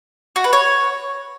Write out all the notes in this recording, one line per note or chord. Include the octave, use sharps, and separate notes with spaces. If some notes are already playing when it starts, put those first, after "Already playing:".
F#4
B4
C#5